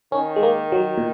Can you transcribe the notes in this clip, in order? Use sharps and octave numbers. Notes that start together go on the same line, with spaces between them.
D#3 C#4
G#3
A#3
F#3
A#2